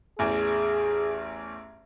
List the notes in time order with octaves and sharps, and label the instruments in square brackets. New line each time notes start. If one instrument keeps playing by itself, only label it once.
[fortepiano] A1 E2 [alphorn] G#4